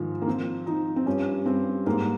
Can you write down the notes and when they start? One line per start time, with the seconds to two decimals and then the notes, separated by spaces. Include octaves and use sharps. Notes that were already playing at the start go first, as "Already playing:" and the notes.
Already playing: G#2 D#3 F3
0.22 A#3
0.27 F3 C4
0.66 F3 D#4
0.96 C4
1.06 G2 C#4
1.46 G2 C4
1.86 G#2 A#3